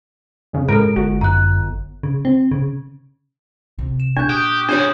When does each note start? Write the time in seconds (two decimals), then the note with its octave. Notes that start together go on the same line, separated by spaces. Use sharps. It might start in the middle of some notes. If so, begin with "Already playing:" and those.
0.53 F2 C#3
0.68 A2 G#3 A4 A#4 D7
0.96 G1 F#4
1.21 F#2 A#5 F#6
2.03 C#3
2.25 C4
2.51 C#3
3.78 C3 F3
4.00 E7
4.17 A#2 D4 C#6 F#6 G6
4.30 G4 D#6
4.69 C#3 D4 G4 C5 C#5 G6 D#7 F#7